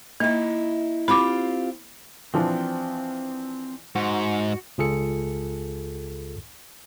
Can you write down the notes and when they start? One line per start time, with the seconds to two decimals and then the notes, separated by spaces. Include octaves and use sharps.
0.20 A#3 D#4 E4
1.08 C4 F4 G4 B5 D6
2.34 E3 F3 C4 D4
3.95 G#2 F#4
4.78 C#2 F4 G#4 A4 C#7